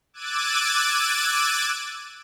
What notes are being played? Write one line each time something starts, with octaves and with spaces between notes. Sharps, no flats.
D6 E6 F#6 G#6 A6 D#7